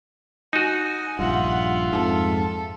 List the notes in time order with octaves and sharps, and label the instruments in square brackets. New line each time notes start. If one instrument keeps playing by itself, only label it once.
[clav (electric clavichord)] D#4 F#4 [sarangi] G#5
[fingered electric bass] A#1 G2 [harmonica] F4 E5 [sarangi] F#5
[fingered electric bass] F2 G#2 [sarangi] A4